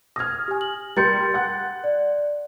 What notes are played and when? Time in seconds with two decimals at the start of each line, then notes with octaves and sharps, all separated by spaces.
0.16 D#6 F6 G#6 A#6
0.48 G4 G#5
0.61 F#7
0.97 G3 A#4 C6 G6 A6 C#7
1.34 F#5 F#6
1.84 D5